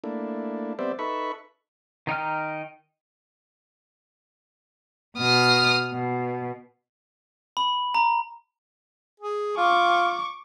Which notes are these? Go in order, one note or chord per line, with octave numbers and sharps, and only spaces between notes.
A3 A#3 D4 E4
G3 B3 C4 C5 D5 E5
D#4 A4 B4 E5 B5 C#6
D#3 D#4 G5 F6
B2 D#6 F6
B2
B5
A#5
G#4
F4 C#6 D6